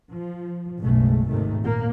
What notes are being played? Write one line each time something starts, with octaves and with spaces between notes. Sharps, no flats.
F3
F#1 B1 B2 G#3 A3
G#1 D#2 C3 D#3 A3
A#2 A#3